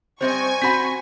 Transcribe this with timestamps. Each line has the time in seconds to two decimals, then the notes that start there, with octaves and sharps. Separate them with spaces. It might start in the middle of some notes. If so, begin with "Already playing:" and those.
0.21 G3 C4 C5 D#5 G#5 C#6
0.62 C4 F#4 F#5 B5 B6